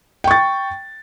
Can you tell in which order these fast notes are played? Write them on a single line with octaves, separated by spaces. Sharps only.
G5 C#6 A6